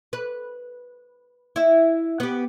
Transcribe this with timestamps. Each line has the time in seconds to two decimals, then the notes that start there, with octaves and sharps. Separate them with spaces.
0.13 B4
1.56 E4 E5
2.20 B3 G4